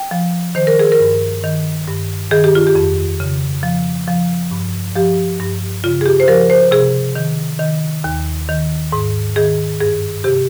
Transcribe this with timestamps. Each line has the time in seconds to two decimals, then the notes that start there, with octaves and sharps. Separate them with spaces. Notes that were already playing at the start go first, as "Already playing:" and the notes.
Already playing: G5
0.11 F3
0.55 D#3 C5
0.67 A#4
0.79 G#4
0.92 A#4
1.00 G2
1.44 D#3
1.88 G2
2.31 D#3 G#4
2.44 G4
2.55 F4
2.67 G4
2.75 F2
3.20 C#3
3.63 F3
4.08 F3
4.51 G2
4.96 F3 G4
5.40 G2
5.84 C#3 F4
6.01 G#4
6.06 G4
6.20 C5
6.28 F3 A#4
6.50 C5
6.71 C3 G#4
7.15 D#3
7.59 D#3
8.04 D#2
8.49 D#3
8.92 G#2
9.36 D#3 G#4
9.80 G2 G#4
10.24 C3 G4